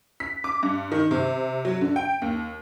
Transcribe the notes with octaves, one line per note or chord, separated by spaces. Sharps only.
B6
D6
G2
D#3
C3
F#3
D3
G5
D#2